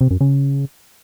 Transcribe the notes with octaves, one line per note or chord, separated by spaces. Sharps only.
C3
F#2
C#3